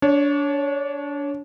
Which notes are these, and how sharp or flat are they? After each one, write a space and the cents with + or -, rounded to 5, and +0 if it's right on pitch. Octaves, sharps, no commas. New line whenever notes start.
D4 -25 C#5 +5